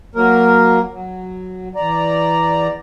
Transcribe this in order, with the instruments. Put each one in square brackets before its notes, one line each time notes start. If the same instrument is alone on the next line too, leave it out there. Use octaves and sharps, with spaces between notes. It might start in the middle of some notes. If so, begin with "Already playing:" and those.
[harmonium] F#3 A#3 A#4
F#3
E2 D5 A#5